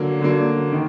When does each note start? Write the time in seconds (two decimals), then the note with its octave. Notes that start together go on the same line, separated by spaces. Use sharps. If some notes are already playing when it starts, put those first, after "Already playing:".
Already playing: D3 F#3 A#3
0.21 D3 F#3 A#3
0.72 D#3